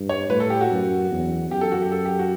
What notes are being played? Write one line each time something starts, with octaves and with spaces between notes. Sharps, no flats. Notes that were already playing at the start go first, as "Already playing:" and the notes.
Already playing: G2
C#5
A2 B4
A4
G4
F#4
F#2
E2
F#2 G4
A4
F#4
G4
A4
G4
F#4